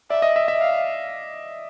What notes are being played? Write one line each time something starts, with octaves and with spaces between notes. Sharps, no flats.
D5 E5
D#5
E5
E5
F5